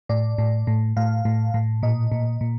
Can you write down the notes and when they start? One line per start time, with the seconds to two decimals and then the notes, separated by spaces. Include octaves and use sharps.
0.09 A2 D5
0.38 A2
0.67 A2
0.97 A2 F5
1.25 A2
1.54 A2
1.83 A#2 D#5
2.12 A#2
2.41 A#2